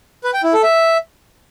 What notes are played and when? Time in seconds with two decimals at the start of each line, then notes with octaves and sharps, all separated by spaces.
0.24 B4
0.34 G5
0.44 E4
0.53 A4
0.63 E5